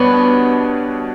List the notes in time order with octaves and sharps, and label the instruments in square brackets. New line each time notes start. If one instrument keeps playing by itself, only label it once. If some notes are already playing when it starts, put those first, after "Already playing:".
Already playing: [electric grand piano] B2 G3 D4 F#4 C#5 [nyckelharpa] B3